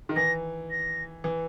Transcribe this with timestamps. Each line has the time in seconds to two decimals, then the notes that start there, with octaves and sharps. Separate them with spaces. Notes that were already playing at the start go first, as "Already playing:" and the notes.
0.09 D#3
0.16 E3 A#6
0.71 A#6
1.24 E3